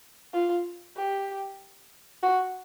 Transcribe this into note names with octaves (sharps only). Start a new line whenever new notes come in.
F4
G4
F#4